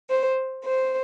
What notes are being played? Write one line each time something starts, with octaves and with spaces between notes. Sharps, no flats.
C5
C5